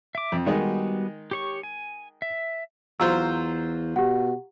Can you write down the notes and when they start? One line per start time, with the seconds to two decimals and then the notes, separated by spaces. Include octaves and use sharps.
0.15 E5 D6
0.32 F2
0.46 D#3 G3 G#3 B3 D#4 F#4
1.31 G4 C#5 C#6
1.63 G#5
2.22 E5
3.00 E2 F#3 F4 C5 A#5 E6
3.96 B2 G4 F#5